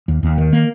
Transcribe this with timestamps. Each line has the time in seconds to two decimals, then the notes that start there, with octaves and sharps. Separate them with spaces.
0.08 D#2
0.23 D#2
0.38 D#3
0.53 A#3